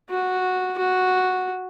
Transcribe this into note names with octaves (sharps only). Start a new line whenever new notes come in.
F#4
F#4